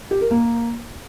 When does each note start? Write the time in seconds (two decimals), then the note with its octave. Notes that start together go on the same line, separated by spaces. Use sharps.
0.11 G4
0.21 A#4
0.31 A#3